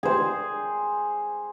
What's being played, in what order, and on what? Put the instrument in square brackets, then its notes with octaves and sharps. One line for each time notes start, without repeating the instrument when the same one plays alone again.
[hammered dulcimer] G#4 C5